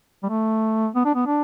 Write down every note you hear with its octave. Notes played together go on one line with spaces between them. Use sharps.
G3
A3
B3
D4
B3
D4